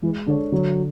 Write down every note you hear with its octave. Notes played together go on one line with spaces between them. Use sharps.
E3 G#3
D3 D4 A4 C#5
D3 F#3